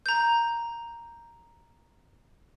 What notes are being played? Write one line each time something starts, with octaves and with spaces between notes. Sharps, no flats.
A#5 G6